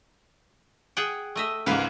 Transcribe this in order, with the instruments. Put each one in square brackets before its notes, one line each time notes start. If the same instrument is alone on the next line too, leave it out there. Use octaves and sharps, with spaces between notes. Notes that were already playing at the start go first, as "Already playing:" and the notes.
[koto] G#4 F#5 G5
A3 D#5 E5
[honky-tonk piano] C#2 G#2 [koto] A#3 B4 F5